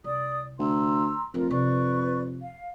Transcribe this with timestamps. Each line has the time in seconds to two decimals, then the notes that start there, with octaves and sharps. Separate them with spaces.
0.04 C2 D5 D#6
0.59 D2 A#5 C6 E6
1.34 D1 F2 D4 F4 A#4
1.50 C3 B4 D5 C#6
2.42 F5